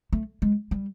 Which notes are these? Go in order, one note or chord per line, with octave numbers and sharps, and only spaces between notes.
A3
G#3
G3